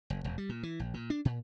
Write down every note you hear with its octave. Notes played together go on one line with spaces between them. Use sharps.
F#1
E1
G3
A#2
E3
A#1
A#2
D4
A#2